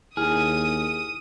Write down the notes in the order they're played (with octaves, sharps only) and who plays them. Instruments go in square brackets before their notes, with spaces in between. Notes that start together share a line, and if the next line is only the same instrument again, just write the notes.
[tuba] D#2 [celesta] E4 F6 [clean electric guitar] G#4 [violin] D#6 D#7